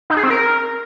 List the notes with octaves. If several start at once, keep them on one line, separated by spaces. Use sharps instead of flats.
D#4
G#4
C4
A#4